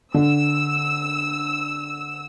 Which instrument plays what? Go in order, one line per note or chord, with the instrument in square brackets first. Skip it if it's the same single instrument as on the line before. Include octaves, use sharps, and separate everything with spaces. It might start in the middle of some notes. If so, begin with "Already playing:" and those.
[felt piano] D3 [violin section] E6